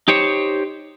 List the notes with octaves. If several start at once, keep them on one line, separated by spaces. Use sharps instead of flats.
D#4 G4 C5 C#5